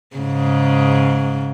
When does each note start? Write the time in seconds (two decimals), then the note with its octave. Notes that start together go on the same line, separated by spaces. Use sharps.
0.16 G#2 C#3